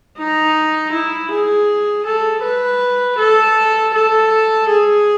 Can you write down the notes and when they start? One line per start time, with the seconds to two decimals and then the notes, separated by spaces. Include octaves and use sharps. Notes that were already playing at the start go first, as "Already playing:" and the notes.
0.18 D#4
0.92 E4
1.31 G#4
2.06 A4
2.43 B4
3.18 A4
3.94 A4
4.68 G#4